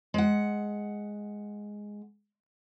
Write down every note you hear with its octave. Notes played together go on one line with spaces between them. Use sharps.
G#3 F#5